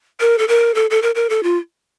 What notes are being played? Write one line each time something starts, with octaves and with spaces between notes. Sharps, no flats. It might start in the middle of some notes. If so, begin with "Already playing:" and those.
A#4
A4
A#4
A4
A4
A#4
A#4
A4
F4